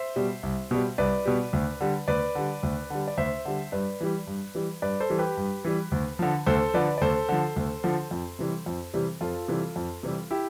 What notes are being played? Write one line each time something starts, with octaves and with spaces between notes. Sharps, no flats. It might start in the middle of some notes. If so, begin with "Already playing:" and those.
Already playing: C5 E5
B2 G3
C2
B2 G3
C2 B4 D5
B2 G3
D2
D3 G3
D2 B4 D5
D3 G3
D2
D3 G3
D5
D2 C5 E5
D3 G3
G2 B4 D5
E3 G3
G2
E3 G3
G2 B4 D5
A4 C5
E3 G3
G4 B4
G2
E3 G3
D2
D3 F3
D2 A4 C5
D3 F3 B4 D5
D5
D2 A4 C5
D3 F3
D2
D3 F3
F2
C3 E3 G3
F2
C3 E3 G3
F2 F4 A4
C3 E3 G3
F2
C3 E3 G3
E4 G4